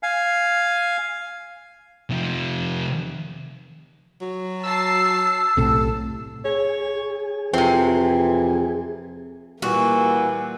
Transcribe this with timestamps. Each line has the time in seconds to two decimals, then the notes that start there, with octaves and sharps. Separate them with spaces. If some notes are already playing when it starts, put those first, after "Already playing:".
0.03 F5 G#5
2.10 C3 F3
4.21 F#3
4.63 A5 E6 C7
5.57 B1 A2 C3 A4
6.45 G#4 C#5
7.54 F2 C3 E3 C4
9.62 A#2 E3 G3 A#3 F#4